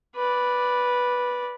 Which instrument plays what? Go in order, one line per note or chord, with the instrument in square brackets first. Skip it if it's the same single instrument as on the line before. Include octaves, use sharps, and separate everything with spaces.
[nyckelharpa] B4 D5